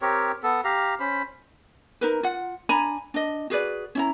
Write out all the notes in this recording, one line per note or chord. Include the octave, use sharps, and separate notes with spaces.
C4 G4 A#4 C#5
B3 A4
G4 F5 A#5
C#4 C5 B5
D#4 A#4 B4
F4 F#5
D4 G#5 A#5 B5
D4 D#5
F#4 G#4 B4 D5
C#4 E4 A#5